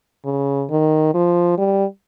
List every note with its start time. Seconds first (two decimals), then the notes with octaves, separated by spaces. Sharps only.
0.25 C#3
0.70 D#3
1.14 F3
1.58 G3